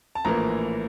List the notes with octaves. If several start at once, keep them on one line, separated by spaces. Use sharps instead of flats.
A5
A#1 A2 E3 A#3 A#5